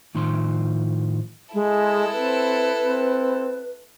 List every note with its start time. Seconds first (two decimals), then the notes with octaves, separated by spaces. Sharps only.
0.15 A2 D#3 F3 C6
1.54 G#3 E4 A4
2.12 C4 B4
2.79 C4